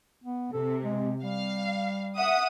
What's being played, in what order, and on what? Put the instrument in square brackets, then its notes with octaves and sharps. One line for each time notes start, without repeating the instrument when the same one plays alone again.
[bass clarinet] B3
[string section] C3 [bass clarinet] A4
[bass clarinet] G#3
[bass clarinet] G3 [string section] F5
[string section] E5 F#5 D#6